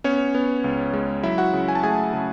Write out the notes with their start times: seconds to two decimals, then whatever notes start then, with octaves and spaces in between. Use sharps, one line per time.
0.04 B3 C#4 C#5
0.35 B3
0.64 C#2
0.93 G#3
1.23 F#3 E4 E5
1.38 F#4 F#5
1.53 C#3
1.68 G#5
1.75 A5
1.83 A3 G#4 G#5
2.13 C#3